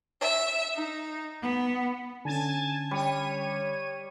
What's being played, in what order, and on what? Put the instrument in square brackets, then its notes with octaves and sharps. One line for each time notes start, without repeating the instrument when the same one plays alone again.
[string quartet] E5
D#4
B3
[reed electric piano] D3 C#4 [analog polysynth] G#5 A5
[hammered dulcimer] G3 [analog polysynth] C#5 D#7